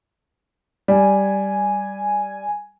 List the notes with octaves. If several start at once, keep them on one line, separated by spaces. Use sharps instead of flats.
G3 G#5